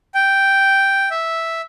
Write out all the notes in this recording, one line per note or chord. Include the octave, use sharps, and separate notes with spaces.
G5
E5